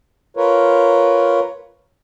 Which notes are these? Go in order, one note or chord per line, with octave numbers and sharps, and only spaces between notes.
F4 A#4 B4 C#5